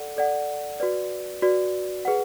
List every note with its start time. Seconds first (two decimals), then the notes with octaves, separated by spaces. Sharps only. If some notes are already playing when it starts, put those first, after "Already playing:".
Already playing: A4 D5 F#5
0.17 A4 D5 F#5
0.80 F#4 B4 D5
1.42 F#4 B4 D5
2.05 G#4 B4 F#5